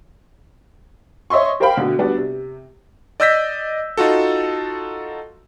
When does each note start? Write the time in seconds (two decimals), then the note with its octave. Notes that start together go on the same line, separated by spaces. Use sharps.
1.30 C#5 D#5 E5 C6 C#6
1.60 G4 A#4 C5 F5 G5 B5
1.77 B2 D3
1.99 G3 B3 D4 F#4
2.17 C3
3.20 D5 D#5 E6 G6 A#6 B6
3.97 D#4 F4 F#4 A4